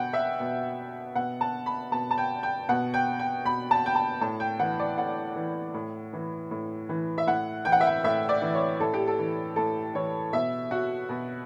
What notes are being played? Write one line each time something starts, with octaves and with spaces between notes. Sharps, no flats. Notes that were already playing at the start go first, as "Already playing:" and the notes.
Already playing: B2 F#5 G5
E5
B2
B2 F#5
A5
B5
B2 A5
A5
G5
G5
B2 F#5
G5
G5
B2 B5
A5
G5
A5
A2 A5
G5
E3 F#5
D5
A2 F#5
E3
A2
E3
A2
E3
E5
A2 F#5
E3 G5
F#5
E5
F#5
A2 E5
D5
E3
C#5
A2 A4
G4
A4
E3
A2 A4
E3 C#5
B2 E5
F#4
B2